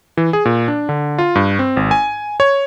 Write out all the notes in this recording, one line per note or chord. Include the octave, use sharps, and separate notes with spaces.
E3
G#4
A#2
D4
D3
F4
G2
C4
G#1
G#5
C#5